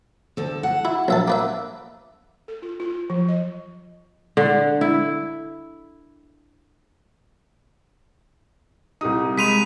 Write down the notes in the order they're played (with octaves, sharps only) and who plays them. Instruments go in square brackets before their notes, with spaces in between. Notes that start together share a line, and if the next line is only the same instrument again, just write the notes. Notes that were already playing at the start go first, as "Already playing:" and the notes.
[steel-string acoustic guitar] D2 A4
F#5
[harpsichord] E4
A#1 E5 A5
A#3 B4 E5
[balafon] A4
F4
F4
F3
D#5
[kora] D3
E4
[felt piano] C2 G4 D#6 [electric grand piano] D#4
[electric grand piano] G#3 B5 C6 [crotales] B6 D#7 F7